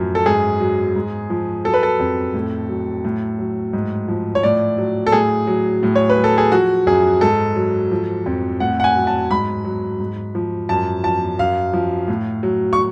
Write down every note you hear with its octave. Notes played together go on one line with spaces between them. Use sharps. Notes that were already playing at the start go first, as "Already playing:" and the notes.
Already playing: F#2 A2 F3 F#3
A4
G#2 G#4
F#3
G#2
F3
F#3 A4
B4
A4
F2
A2
F#3
A2
F#3
G#2
F3
C#5
A2 D5
F#3
A4
A2 G#4
F#3
A2
C#5
B4
F#3
A4
G#4
F3 F#4
F#2 G#4
G#2 A4
F#3
F3
F2
A2 F#5
F#5
G#5
F#3
A5
G#2 B5
F#3
G#2
F3
F#2 A5
F3 A5
F#2 F5
F3
A2
F#3
C#6